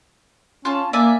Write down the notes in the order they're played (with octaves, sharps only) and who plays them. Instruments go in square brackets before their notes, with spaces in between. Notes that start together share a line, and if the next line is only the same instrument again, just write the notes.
[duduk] C#4 [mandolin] F4 A5
[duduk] A#3 [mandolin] D5 E5 G#5